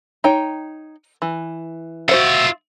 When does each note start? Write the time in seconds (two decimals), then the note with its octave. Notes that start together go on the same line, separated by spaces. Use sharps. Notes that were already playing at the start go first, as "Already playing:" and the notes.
0.24 D#4 C#5 G5
1.22 E3
2.09 F4 F#4 C5 E5 F#5